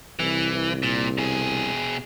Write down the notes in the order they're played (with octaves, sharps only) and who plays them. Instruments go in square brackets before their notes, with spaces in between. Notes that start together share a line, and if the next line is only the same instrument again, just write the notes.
[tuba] C2 [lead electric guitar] E3
[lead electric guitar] A#2
B2 G#4